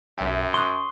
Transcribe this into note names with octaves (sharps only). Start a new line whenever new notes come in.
B1 F#2 E5 G5
C6 C#6 D#6 F#6